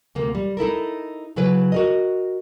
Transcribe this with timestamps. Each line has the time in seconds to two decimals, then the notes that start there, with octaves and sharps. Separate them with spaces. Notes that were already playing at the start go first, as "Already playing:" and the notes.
0.15 D2 C3 A#3
0.35 G3
0.57 D#4 E4 A4 A#4
1.36 C#3 F#3 E4 B4
1.72 F#4 A#4 D#5